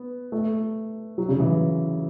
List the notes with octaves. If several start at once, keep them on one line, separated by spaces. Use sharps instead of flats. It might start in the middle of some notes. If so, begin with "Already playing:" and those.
Already playing: B3
A3
F#3
C#3
E3